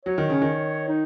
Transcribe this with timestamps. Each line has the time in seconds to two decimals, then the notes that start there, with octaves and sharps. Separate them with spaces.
0.06 F#3 C#5
0.18 D#3
0.30 C#3
0.42 D#3
0.88 D#4